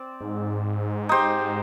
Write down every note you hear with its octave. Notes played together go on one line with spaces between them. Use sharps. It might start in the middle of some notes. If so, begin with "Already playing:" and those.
Already playing: C4 D5
G#2
D#4 G4 C5